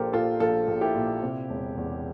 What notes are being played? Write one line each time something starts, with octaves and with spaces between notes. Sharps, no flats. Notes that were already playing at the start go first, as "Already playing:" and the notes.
Already playing: A#1 A#2 G4 A4 A#4 C5
A#2 F4 A4
A#1 F4 A4
A#1
E4 G4
A#2
C3
E1
E2